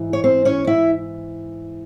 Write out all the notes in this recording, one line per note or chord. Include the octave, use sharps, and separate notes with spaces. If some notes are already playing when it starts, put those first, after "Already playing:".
Already playing: G#2 E3
C#5
C4 C5
C#4 C#5
E4 E5